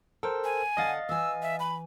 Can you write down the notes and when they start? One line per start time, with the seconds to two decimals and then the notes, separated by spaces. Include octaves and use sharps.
0.23 A4 A#4 C5 G5
0.44 G#5
0.77 D3 D4 D#5 F5 F#5 A6
1.09 E3 G#5 E6
1.42 E5
1.60 B5